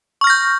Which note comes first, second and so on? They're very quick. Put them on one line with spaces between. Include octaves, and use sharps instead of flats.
C#6 F6 A#6 G6